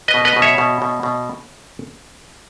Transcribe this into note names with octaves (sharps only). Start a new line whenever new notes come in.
B4 D#5
B2
B4 D#5
B2
C#5 E5
B2
B2
B2